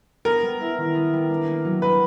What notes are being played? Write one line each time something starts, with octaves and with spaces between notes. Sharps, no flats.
B3 A#4
G3
E4
D#3
B3
G3
D4
A#3
F#3
F#3 B4